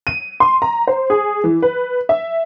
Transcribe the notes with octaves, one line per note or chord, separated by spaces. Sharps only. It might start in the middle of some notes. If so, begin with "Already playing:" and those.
D#7
C6
A#5
C5
G#4
E3
B4
E5